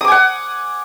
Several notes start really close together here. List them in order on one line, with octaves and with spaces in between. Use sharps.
D#6 D6 G#5 F#5